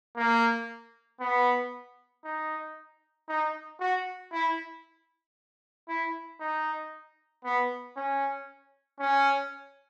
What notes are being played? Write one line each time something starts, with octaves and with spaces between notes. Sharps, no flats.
A#3
B3
D#4
D#4
F#4
E4
E4
D#4
B3
C#4
C#4